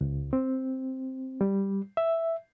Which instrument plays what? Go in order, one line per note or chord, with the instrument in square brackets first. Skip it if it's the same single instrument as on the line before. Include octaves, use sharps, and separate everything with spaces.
[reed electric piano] C#2
C4
G3
E5